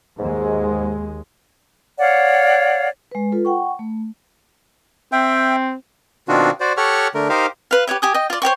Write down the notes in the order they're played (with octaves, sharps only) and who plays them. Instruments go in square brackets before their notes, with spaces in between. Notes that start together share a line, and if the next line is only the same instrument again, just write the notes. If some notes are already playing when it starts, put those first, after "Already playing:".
[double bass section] D#2 G#3 [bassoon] G#2
[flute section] C#5 D5 F5 F#5
[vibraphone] G#3 B4
F4 A4 B4
F#5 G5 C#6
A3
[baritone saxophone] C4 [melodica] E5 G5
[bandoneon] B2 D#3 C4 D4 F4 F#4
F#4 C5 D5
G4 A4 C#5 F#5 C#6 F6
D3 A3 A#4
D#4 G4 A#4 C5 F5
[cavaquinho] B4 F5
G4 B4 C#5 E5
G4 G#5 D#6
D#5 G5
F4 D5
C5 C#5 G5 C#6